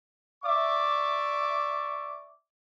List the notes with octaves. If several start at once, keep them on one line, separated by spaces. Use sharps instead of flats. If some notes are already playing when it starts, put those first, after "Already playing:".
D5 E5 C#6 D6